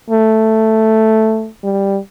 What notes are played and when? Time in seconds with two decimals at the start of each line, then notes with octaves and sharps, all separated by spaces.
0.10 A3
1.64 G3